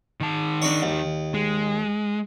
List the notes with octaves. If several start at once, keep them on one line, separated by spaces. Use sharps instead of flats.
D#3 A5
D4 D#4 C#5
D#2
G#3